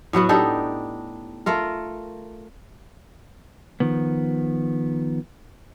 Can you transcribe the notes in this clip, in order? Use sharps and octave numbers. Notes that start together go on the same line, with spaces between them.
A2 F#3 B3 F#4
D4 D#4 G4 A4
A3 F4 A#4
D#3 F3 B3